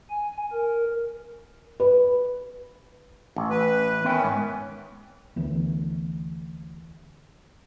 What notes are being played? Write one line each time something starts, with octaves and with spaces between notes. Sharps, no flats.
G#5
A#4
B4
A1
B4
D#3 B3 C#4 E5 G5
G#2
D2 E3 B3